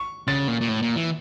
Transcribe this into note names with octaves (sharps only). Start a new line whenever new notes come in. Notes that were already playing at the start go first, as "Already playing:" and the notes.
Already playing: C#6
C#3 A6
A#2
A#2
A2
A#2
E3